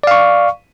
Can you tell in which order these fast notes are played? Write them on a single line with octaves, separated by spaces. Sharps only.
D5 F5 C#6